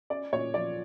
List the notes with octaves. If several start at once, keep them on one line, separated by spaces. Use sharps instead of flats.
C#4 D5
A#2 C#5
F3 D5